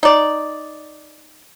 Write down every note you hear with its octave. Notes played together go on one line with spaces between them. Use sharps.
D#4 D5